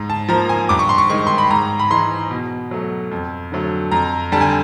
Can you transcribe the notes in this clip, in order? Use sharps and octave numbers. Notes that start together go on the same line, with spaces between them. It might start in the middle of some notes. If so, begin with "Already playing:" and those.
Already playing: G#2
A5
F3 A#3 A#5
G#5
G2 D6
C#6
C6
C#6
D#3 G#3 C#6
C6
B5
G#2 A#5
B5
E3 G#3 C6
B2
F#3 A3
F2
D3 F#3 A3
F2 A#5
D3 G3 A5
G#5